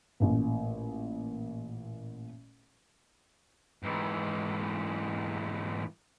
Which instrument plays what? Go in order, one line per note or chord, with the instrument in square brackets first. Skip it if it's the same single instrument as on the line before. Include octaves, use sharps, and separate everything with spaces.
[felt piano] A1 A#2
[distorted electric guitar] G#2 E3